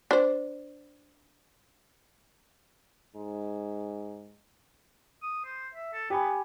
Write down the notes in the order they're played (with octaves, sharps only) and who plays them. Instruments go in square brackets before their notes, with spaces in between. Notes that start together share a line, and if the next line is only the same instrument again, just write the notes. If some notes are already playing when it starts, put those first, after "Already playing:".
[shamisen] D4 C5
[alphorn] G#2
[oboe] D#6
C5
E5
A4
[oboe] B3 [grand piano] G4 G#5 B5